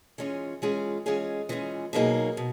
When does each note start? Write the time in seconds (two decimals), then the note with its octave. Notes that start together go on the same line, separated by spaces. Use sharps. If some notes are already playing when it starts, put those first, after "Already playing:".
0.18 E3 G#3 C#4 F4 G#4
0.62 E3 G#3 C#4 F4 G#4
1.06 E3 G#3 C#4 F4 G#4
1.49 E3 G#3 C#4 F4 G#4
1.93 B2 F#3 A#3 D#4 G#4
2.37 B2